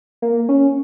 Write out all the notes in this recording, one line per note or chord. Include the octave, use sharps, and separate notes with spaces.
A#3
C#4